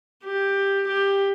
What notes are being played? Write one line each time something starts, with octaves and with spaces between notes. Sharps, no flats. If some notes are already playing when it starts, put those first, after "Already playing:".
G4
G4